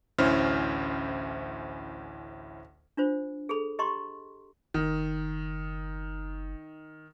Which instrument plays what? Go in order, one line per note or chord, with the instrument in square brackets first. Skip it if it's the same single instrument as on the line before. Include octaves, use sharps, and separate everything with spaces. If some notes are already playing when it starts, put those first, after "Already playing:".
[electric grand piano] A1 D2 C#4 E4 C5 F6
[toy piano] D4 F4 C5
G#4 A4 B5
G4 D#5 A#5 C6 C#6
[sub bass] F#1 [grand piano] D#3